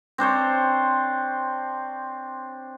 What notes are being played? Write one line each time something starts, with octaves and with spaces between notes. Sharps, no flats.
C4 D4 C5 C#5